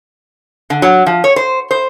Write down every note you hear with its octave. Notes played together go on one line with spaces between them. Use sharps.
D3
F#3
F3
C#5
C5
C5